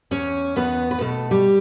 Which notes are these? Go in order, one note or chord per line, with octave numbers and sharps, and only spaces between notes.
E2 C#4 C#5
E2 B3 B4
B4
B2 A3 A4
G3 G4